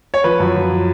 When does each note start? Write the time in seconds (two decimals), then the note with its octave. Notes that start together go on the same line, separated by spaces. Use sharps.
0.14 C#5
0.24 F3 B4
0.40 F#2
0.55 F3